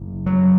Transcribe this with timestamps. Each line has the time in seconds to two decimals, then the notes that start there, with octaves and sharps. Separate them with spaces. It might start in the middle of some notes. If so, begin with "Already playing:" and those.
Already playing: F#1
0.26 F#3